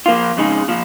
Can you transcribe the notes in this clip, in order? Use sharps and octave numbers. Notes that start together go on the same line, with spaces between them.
F3 A#3 F4
F2 C#3 G#3 D#4 G#4
A#2 F3